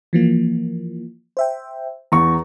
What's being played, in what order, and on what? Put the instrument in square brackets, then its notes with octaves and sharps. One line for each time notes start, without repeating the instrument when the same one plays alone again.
[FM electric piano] E3 F3 A#3
C5 E5 G5
[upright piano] E2 C#6 [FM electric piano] A#5